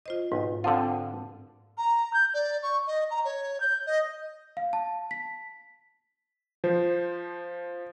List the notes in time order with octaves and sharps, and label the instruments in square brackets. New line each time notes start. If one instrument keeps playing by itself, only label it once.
[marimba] F4 C5 D#5
[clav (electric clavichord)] B1 [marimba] G#2
[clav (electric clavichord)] D3 F3 F4 [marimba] C4 G5
[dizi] A#5
G6
D5
C#6
D#5
A#5
C#5
G6
D#5
[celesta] F5
A5
B6
[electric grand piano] F3 C5